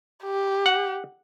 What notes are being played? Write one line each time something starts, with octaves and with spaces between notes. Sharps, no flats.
G4
F#5